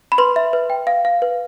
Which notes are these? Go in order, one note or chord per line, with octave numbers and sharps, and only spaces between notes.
B5
B4 C6
E5
B4
G5
F5
F5
B4